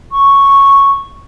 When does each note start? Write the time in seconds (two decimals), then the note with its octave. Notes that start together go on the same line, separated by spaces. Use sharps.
0.12 C#6